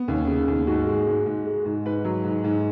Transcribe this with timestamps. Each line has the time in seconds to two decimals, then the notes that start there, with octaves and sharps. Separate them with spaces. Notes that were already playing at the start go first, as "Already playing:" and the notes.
Already playing: B3
0.08 D#2 C#4
0.27 C#3
0.48 D#2
0.67 G#2 F#4
0.87 G#3
1.06 G#2
1.26 G#2
1.46 G#3
1.65 G#2
1.85 G#2 B4
2.04 F#3
2.24 G#2
2.44 G#2